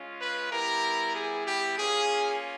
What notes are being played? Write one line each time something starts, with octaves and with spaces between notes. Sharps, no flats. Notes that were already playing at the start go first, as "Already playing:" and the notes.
Already playing: G#3 C#4 F4
B4
G3 B3 E4 G4 A#4
G#4
G4
A#3 C#4 F4 G#4